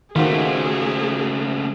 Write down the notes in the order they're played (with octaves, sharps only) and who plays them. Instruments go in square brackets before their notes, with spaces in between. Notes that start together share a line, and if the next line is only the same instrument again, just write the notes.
[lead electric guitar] C#2 A3 [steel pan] D#3 [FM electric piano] F4 F#4 C5 [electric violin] G#4